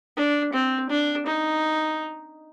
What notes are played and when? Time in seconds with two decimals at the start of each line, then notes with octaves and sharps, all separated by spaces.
0.17 D4
0.53 C4
0.90 D4
1.26 D#4